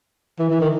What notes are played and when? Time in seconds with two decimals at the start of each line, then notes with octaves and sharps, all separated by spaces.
0.39 E3
0.50 E3
0.60 D#3